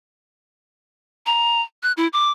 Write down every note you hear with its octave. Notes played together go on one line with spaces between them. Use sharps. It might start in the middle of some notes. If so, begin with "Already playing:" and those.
A#5
F#6
E4
D6